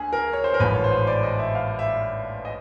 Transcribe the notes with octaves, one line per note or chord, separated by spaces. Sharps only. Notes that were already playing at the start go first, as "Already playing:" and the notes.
Already playing: D2 G#4
A#4
C#5
C5
A#4
A1 G#2 F3 B4
C#5
C5
D5
D#5
E5
F5
E5
D#5